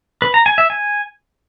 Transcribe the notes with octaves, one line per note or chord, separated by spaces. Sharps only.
B4
A#5
G#5
E5
G#5